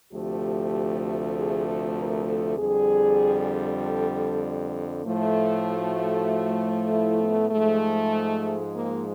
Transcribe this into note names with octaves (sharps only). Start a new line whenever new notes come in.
D2 C3 F3 A3 G4
G#4
A4
A#4
A4
F2 D3 G3 G#4
A4
A4
A2 F3 A3
F#4
E4
B3
G#2 F3 G#3 A3
A#3